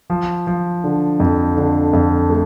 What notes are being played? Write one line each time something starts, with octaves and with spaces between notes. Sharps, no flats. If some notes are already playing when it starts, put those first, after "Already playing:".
F3
F3
D3
F2
D3
F2
A3